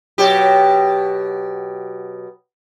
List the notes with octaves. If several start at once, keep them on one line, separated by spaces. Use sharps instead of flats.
B2 F#3 G4